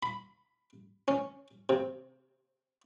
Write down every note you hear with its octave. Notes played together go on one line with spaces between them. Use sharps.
B5
C#4
C3